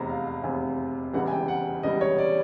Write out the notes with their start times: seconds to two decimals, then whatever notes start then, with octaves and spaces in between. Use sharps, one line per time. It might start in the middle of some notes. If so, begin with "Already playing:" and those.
Already playing: F1 E2 C3 A#5
0.09 F5
0.26 F5
0.43 F1 E2 C3 G#5
1.13 E1 E2 C#3 E3 G3 F#5
1.27 G#5
1.31 G5
1.48 F#5
1.83 E1 E2 C#3 E3 G3 D#5
2.01 C#5
2.18 D5